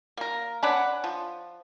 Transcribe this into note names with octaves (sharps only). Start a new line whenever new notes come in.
A#3 A#4
C#4 D4 B4 F#5
F3